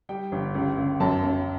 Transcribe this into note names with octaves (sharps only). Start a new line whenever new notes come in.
G3 G5
G1
C#2
C#2
F#2 A5
F#2